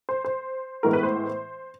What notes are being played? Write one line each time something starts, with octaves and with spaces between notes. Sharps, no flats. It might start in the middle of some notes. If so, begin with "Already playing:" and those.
C5
C5
A2 E3 G#3 B3 A#4
B4
C5